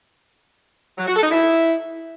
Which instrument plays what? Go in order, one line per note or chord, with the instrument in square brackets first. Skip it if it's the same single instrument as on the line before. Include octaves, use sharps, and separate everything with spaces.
[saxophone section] F#3
F#4
A4
D#4
E4